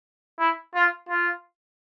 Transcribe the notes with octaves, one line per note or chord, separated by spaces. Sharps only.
E4
F4
F4